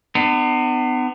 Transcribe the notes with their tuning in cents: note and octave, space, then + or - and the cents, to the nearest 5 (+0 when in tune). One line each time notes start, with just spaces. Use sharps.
B3 +30 D4 +45